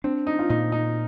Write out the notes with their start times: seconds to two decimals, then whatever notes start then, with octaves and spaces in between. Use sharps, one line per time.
0.04 C4 D4
0.27 D#4
0.39 F4
0.49 A#2 D#4
0.72 D#4